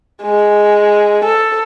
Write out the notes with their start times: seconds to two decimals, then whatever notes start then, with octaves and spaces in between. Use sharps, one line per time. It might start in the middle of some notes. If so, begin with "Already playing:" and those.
0.23 G#3
1.25 A4